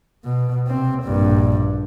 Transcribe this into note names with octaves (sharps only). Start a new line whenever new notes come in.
B2
C3 C4
A#1 G2